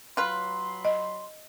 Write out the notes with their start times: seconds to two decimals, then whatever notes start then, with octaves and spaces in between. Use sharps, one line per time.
0.17 F#3 F4 B4 B5 C6
0.85 D#5